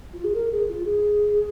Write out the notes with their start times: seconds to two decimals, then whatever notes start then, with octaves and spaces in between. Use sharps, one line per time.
0.13 F4
0.24 G#4
0.35 A#4
0.52 G#4
0.69 F4
0.85 G#4